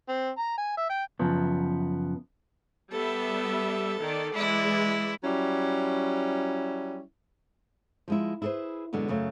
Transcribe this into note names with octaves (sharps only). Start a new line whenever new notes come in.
C4
A#5
G#5
E5
G5
F#2 C#3 F3 B3
G3 B3 A4 E5
D#3 D5
E3 G#3 E4 D5
F#3 G3 C#4 E4
F3 G#3 E4
E4 G#4 A4 B4 C5
F#2 B2 D3 G#3 B3
F#2 C#3 A3 C#5